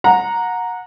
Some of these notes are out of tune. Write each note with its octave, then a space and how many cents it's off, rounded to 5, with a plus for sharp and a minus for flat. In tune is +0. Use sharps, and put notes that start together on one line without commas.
F#5 -20 A#5 +0